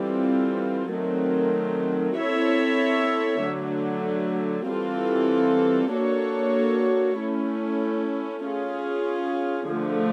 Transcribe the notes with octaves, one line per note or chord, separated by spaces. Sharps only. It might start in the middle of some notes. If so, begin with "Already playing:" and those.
Already playing: E3 G3 C4 F4 A4
D#3 F#3 A3 C4
C4 E4 A4 C#5 E5
D3 F#3 A3
E3 G3 C4 F4 A4
A#3 D4 F#4 A4 C#5
A3 C#4 E4
C#4 F4 G#4
D3 F3 A3